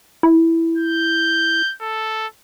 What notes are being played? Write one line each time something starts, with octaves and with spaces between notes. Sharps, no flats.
E4
G6
A4